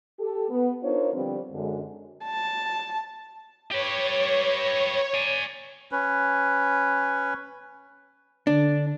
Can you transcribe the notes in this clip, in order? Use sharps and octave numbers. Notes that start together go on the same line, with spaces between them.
G4 A4
B3
D4 D#4 F4 A#4 C5 C#5
D3 F3 G3 B3 C4
F#2 D3 G#3
A5
G4 B4 C#5
D5 G#5
C#4 B4
D3 D4